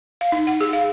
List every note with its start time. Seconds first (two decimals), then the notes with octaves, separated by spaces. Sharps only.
0.21 F5
0.32 D#4
0.47 F#5
0.61 G#4
0.73 F5